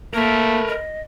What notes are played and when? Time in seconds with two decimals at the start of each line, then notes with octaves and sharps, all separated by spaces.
0.14 A3 A#3 A#4 B4
0.68 D#5